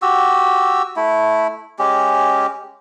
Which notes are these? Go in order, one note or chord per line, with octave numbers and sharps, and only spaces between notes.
F#4 G4 E6
A3 E4
G#3 C#4 G4